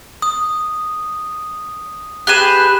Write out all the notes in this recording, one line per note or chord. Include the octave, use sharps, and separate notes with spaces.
D#6
G4 G#4 B4 F#6 E7